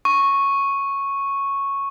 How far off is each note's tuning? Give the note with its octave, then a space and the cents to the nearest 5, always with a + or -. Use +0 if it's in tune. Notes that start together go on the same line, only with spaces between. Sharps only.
C#6 -5